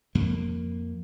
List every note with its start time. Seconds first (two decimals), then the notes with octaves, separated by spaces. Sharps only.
0.15 F2 A#3